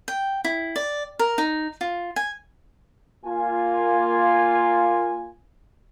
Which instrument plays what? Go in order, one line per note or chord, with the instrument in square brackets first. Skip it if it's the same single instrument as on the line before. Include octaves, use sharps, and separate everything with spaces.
[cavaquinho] G5
E4
D5
A#4
D#4
F4
G#5
[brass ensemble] A#3 F4 G#5